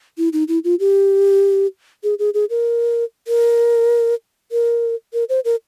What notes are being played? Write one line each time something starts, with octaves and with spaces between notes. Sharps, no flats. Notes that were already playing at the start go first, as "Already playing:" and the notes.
E4
D#4
E4
F4
G4
G#4
G#4
G#4
A#4
A#4
A#4
A#4
C5
A#4